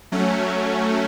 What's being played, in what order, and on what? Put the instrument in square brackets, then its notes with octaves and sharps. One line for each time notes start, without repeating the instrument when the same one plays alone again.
[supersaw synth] F#3 A3 C#4